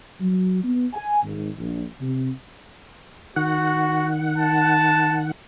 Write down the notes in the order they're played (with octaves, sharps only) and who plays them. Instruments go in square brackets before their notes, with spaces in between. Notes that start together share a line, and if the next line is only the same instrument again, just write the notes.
[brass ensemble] F#3
B3
G#5
G#1
A#1
C3
[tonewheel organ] D#3 F#5 [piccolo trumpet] F#4
[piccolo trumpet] A5